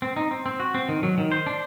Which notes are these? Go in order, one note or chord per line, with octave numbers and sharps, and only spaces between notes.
C4
D#4
C4
C4
F#4
C4
D#3
F#3
D#3
C5
D4